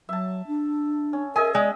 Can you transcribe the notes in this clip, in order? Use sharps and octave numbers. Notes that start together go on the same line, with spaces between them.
F#3 E5 A5
D4
C#4
G#4 A#4 D#5 E5 G#5
G#3 D5 G5